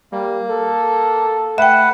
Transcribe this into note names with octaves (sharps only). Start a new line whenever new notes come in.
G3 A#3
A4
A3 B4 E5 F#5 G5